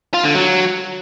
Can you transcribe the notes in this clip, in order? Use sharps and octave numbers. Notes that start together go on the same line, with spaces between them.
F4
D3
F#3